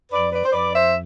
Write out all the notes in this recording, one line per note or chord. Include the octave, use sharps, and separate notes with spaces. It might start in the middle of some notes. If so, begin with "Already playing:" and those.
F2 B4 D5
B4 D5
C5
F2 B4 D5
C5 E5